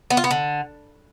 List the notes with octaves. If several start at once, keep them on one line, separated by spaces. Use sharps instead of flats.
B3
F4
B3
D3